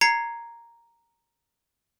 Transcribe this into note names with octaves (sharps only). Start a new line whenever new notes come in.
A#5 G#6 C7 C#7